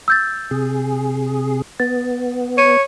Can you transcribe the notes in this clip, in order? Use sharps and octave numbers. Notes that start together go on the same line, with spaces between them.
E6 G6 A6
C3 G#4
B3 A6
C#5 D#7